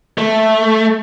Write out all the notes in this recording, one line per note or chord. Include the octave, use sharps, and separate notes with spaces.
A3